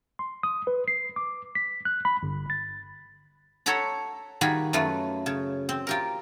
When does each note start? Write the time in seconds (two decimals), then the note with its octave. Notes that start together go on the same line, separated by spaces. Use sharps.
0.19 C6
0.43 D#6
0.67 B4
0.88 C7
1.16 D6
1.55 B6
1.85 F#6
2.05 B5
2.23 G1
2.50 A6
3.66 A4 C#5 F#5 A#5 B5
4.41 D#3 G3 F4 F#4 G#4 B5
4.73 F#2 A3 F4 B4
5.26 C#3
5.69 C4
5.87 F4 G4 A#4